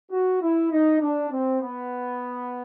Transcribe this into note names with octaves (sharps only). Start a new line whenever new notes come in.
F#4
E4
D#4
D4
C4
B3